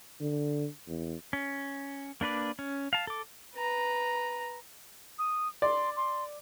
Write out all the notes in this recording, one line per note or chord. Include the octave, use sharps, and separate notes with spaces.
D3
E2
C#4
A#3 D4 B4 D5
C#4
F5 A5
A4 D6
B4 A#5
D#6
D5 C6
C6